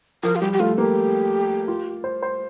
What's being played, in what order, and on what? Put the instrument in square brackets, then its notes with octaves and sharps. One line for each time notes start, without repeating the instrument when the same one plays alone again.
[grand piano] F3 [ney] A#4
[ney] F4
[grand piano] G3 [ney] G4
[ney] G4
[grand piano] A3 [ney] F4
[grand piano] A#3 [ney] G4
[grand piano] F4
C5
C5